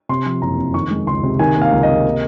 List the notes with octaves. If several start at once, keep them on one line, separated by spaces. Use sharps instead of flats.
C3 C6
F3
F#1 A#5
F2
D#3 C#6
G#3
C#2 C6
C3
D#3 G#5
A#3
F5
C#2
D#5
C3
A#3